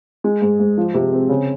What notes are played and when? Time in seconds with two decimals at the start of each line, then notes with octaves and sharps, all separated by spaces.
0.24 G#3
0.42 G#2
0.60 G#2
0.77 F3
0.94 C3
1.12 C4
1.29 C#3